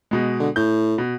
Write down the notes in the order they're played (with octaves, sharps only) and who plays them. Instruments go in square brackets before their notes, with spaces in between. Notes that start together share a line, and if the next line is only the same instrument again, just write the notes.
[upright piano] B2 G#3
[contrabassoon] D3
[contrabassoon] A2 [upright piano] G6
[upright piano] B2